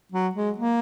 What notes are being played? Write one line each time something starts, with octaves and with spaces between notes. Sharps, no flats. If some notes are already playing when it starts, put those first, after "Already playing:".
F#3
G#3
A#3